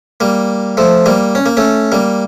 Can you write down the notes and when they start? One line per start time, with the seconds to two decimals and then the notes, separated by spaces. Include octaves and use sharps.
0.20 G3 A#3
0.77 F3 A3
1.06 G3 A#3
1.35 C#4
1.46 A#3
1.57 A3 C#4
1.92 G3 A#3